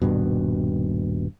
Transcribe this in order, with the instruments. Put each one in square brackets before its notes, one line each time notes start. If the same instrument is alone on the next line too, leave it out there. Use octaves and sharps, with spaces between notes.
[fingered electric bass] D#1 G#1 G2 B2